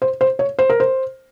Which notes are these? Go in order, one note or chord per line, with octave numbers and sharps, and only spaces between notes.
C5
C5
C#5
C5
A#4
C5